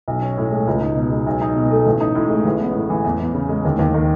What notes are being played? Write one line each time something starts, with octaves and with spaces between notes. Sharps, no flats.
B1
C#4
A2
G#3
C#2
D#4
B2
G#3
B1
D#4
B2
A3
A1
D#4
A2
G#3
A1
B3
A2
E3
E2
E2
C#3
G#3
D#2
D#2
D#3